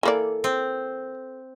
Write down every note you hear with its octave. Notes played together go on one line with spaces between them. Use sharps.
E3 A#3 A4 D5 G#5
C4